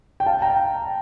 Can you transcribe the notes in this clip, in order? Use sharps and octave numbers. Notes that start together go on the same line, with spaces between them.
G5
F5 A5
G5 A#5